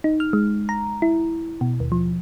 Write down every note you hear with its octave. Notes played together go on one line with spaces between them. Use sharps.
D#4
F6
G#3
A#5
E4
B2
D#2
F3